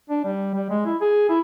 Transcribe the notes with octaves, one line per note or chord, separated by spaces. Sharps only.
D4
G3
G3
G#3
E4
G#4
E4